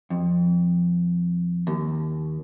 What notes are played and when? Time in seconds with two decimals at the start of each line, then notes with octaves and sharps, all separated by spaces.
0.10 F2
1.67 D#2